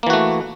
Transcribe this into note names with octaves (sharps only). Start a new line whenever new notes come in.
E3 A3 A#3 F#4